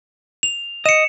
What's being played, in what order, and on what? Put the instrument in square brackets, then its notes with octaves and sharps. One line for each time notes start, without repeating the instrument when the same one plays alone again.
[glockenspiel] F7
[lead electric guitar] D#5 [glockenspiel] C#7 E7